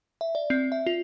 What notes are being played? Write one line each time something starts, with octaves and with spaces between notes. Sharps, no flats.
E5
D5
C4
E5
F4